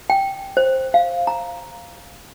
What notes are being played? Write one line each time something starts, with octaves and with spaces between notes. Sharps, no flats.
G5
C5
F5
A#5